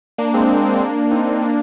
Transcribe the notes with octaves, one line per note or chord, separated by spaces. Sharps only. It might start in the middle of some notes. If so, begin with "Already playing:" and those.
A#3 D4
G#3 C4
G#3 C4
A#3
C4
A#3 D4
C4 D#4
A#3 D4